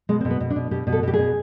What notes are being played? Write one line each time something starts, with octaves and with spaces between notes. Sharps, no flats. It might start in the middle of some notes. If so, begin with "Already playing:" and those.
B2 G#3
C4
B2
B3
B2
D4
B2
B2 G4
B2
A4
B2 G4
G#4
B2